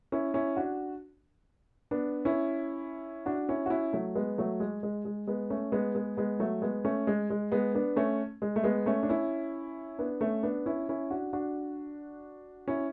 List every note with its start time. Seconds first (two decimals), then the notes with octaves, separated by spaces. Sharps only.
0.12 C#4 E4
0.34 C#4 E4
0.56 D4 F#4
1.91 B3 D4
2.25 C#4 E4
3.26 D4 F#4
3.49 C#4 E4
3.66 F#4
3.70 C#4 E4
3.93 F#3 A3
4.15 G#3 B3
4.38 F#3 A3
4.60 G#3
4.83 G#3
5.05 G#3
5.27 G#3 B3
5.50 A3 C#4
5.72 G#3 B3
5.95 G#3 B3
6.17 G#3 B3
6.40 F#3 A3
6.62 G#3 B3
6.85 A3 C#4
7.07 G#3
7.30 G#3
7.52 G#3 B3
7.74 B3 D4
7.96 A3 C#4
8.42 G#3
8.56 A3
8.64 G#3 B3
8.86 A3 C#4
9.03 D4
9.09 C#4 E4
9.99 B3 D4
10.21 A3 C#4
10.43 B3 D4
10.66 C#4 E4
10.89 C#4 E4
11.11 D4 F#4
11.33 D4 F#4
12.68 C#4 E4